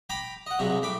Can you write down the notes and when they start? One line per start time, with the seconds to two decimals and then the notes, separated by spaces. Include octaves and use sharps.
0.10 G5 A#5 B5 D6
0.46 D#5 F#5
0.59 G2 C3 F#3 G#3
0.82 A2 B5 D6